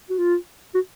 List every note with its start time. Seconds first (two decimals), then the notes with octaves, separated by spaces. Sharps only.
0.10 F#4
0.18 F4
0.75 F#4